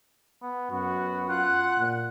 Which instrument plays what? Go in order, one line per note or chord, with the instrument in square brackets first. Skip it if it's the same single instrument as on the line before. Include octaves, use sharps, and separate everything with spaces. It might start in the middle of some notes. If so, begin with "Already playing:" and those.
[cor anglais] B3
[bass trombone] F#2 [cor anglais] B3 [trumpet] F#4
[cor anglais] F4 [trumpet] F#5 [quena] F#6
[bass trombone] A#2